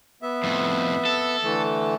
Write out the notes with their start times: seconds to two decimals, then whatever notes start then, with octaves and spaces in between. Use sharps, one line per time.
0.22 B3 E5
0.44 F2 A2
1.05 A4
1.44 D3 E3 A3